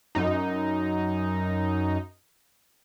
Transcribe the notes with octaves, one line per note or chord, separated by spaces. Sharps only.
F#2 D#4